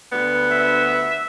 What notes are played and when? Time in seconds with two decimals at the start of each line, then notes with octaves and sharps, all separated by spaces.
0.11 D2 G3 B3
0.51 E5